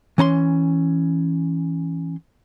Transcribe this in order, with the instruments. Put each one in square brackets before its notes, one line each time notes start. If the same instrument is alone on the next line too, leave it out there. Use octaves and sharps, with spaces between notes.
[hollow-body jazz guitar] E3 C#4 A#5 C6